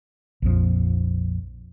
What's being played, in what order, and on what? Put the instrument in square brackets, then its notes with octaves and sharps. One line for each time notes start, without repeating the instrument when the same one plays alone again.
[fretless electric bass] A#1 F2 F3